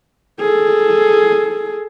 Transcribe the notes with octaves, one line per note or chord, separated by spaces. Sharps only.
G#4 A4